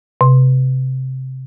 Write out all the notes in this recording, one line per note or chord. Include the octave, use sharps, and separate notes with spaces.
C3